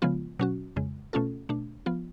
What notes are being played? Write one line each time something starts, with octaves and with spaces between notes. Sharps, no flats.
C#3 F3 G#3 B3 F4
B2 F#3 C#4 F#4
F2 C#3 G#3
B2 A3 C#4 F4 A4
B2 A3 D4
F3 B3 F4